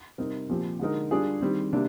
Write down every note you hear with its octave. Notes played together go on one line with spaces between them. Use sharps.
C3 G3 C4 D#4 A#4
A#2 F3 C4 G4
D3 G#3 D#4 A#4
G3 D4 F4 G#4
D#3 G3 C4
C3 G3 A#3 D4